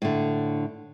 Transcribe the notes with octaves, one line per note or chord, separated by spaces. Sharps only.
A2 D3